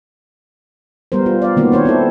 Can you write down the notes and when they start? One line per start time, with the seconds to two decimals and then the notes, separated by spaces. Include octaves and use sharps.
1.12 G3 B3 A#4 C5
1.26 F4
1.42 D5 F5
1.57 D#3 A#3 B3 F#4
1.72 C4 C5 C#5
1.85 C4 E4 A4